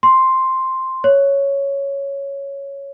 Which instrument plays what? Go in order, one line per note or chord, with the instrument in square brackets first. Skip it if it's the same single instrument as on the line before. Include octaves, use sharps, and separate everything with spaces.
[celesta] C6
C#5